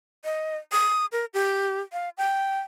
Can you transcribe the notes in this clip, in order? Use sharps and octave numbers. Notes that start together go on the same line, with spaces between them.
D#5
D#6
A#4
G4
F5
G5